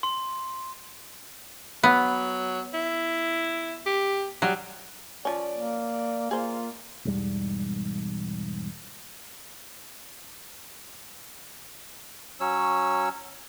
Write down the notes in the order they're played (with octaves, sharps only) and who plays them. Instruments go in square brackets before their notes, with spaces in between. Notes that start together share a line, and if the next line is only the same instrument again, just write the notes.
[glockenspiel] C6
[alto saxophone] F#3 [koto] B3
[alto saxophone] E4
G4
[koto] F#3 [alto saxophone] G3
[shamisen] F3 C#4 [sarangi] D5
[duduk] A#3
[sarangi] D5
[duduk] A#3 [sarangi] F4 [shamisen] G#4 C5
[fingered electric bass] E1 E2 G#2 G3
[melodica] F#3 C#4 C#5 E6